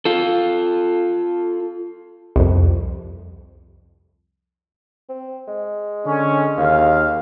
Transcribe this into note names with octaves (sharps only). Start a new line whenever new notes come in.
F4 A4
C2 F2
C4
G#3
D3 C#4
D#2 F5